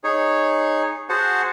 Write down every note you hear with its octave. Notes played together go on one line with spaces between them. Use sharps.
D#4 G#4 C#5
F#4 G#4 C5 F#5 A5